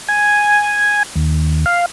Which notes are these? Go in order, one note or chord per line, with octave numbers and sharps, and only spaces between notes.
G#5
D#2
F5